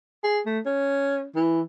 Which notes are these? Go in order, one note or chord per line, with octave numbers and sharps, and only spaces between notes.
G#4
A3
C#4
E3